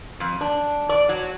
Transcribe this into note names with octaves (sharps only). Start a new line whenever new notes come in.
F2
D4
D5
F#3